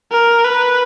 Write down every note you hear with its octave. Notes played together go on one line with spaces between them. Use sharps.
A#4
B4